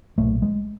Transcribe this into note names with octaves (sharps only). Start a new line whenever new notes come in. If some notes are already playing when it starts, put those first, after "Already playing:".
B1 A#2 A3
G#3